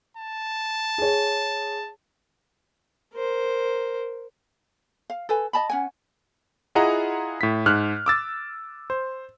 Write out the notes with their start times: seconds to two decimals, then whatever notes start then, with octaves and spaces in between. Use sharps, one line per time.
0.17 A5
0.98 G#4 C#5
3.14 A#4 C5
5.10 F5
5.29 A4 B4 G#5
5.53 D#5 A5 B5
5.70 C#4 F#5 G#5
6.75 E4 F4 G#4 D#5 F#5 A#5
7.41 A2 B6
7.66 G#2 F6 F#6
8.06 D6 E6 A6
8.90 C5